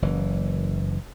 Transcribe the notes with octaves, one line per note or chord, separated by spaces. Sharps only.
F#1 E3